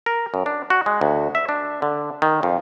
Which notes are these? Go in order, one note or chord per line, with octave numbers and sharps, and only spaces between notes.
A#4
F#2
D4
F#4
G#3
D2
E5
D4
D3
D#3
F2